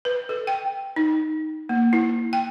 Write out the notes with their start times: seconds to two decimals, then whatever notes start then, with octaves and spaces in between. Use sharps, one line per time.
0.05 B4
0.29 A4
0.47 G5
0.96 D#4
1.69 A#3
1.93 E4
2.33 G5